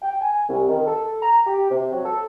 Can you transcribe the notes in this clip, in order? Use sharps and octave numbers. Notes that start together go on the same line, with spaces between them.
G5
G#5
C2
D#3
A4
A#5
G4
C3
F#3
A4